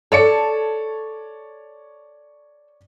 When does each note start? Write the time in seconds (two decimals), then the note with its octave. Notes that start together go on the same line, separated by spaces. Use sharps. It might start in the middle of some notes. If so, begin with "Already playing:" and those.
0.12 A4 C#5 D5 C#7